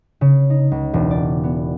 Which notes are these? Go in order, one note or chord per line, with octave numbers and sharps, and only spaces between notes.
C#3
D#4
C#2
E1
D5
B3